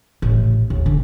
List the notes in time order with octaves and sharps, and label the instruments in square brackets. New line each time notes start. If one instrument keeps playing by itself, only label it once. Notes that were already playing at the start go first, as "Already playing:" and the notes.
[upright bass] A1
D#2
D3